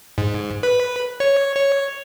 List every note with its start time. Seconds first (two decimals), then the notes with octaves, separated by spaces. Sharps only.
0.18 G#2
0.63 B4
1.20 C#5
1.56 C#5